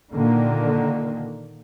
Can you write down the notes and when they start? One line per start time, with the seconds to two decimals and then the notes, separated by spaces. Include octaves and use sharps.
0.12 A#2 D3 D#3 A#3